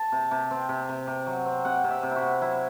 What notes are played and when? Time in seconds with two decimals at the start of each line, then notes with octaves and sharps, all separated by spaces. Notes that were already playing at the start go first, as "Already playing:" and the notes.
Already playing: A5
0.12 C3
0.31 C3
0.51 C4
0.69 C3
0.89 C3
1.07 C3
1.27 F#3
1.46 C4
1.65 C3 F#5
1.84 C3
1.90 E5
2.03 C3
2.11 E4 F#4
2.22 C3
2.41 F#3 E4